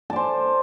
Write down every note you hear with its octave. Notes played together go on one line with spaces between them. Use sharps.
C5 D5 A5